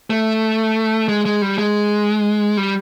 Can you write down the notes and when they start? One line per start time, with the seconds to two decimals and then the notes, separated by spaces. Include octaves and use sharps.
0.10 A3
1.08 G#3
1.26 G#3
1.42 G3
1.58 G#3
2.57 G3